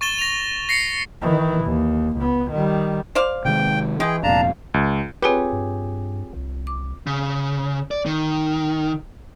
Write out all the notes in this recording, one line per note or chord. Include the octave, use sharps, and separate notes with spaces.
C#6 A6 E7 G7
A#6 F7
A#6 C7 C#7
D#3 E3
D#2
C#2 B3
D#3 G3
C5 D5 F5
C3 D#3 G#3 G5
E3 G#3 G#4 G5
F1 F2 A#2 D4 F5 A5 A#5
C#2
C4 F4 G4 G#4 B4 C#5
G2
C2
D6
C#3
D5
D#3